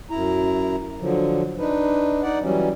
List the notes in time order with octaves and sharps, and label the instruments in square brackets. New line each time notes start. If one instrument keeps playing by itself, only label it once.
[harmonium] F#2 E4 A#5
D3 F3 F#3
D4 D#4 B4
D#4 D5 F#5
E3 F#3 G3 C#4